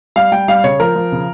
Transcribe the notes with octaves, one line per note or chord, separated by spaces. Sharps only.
G3 F5
G3 G5
G3 F5
C#3 C#5
F3 A#4
F3
C#3